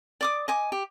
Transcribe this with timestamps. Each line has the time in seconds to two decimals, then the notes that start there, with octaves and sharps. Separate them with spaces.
0.21 D5 D6 D#6
0.48 D#5 G#5 D6
0.72 G4